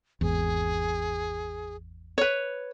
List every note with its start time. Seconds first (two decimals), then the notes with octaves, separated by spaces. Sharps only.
0.21 G#1 E2 G#4
2.18 B4 C#5